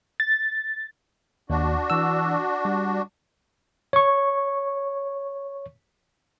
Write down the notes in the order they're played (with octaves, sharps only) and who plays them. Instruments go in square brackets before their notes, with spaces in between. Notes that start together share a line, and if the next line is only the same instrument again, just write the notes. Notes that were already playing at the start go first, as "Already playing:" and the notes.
[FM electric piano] A6
[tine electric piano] D#2 [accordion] D4 F#4
[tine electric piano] E3 E6
G3
C#5 C#6